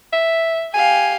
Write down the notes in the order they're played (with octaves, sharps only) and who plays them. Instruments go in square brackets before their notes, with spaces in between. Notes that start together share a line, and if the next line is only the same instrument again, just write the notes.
[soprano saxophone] E5
[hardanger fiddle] G4 F5 [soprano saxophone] G#5